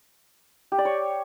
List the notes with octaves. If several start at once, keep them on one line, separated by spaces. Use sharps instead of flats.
G4
D5
C#5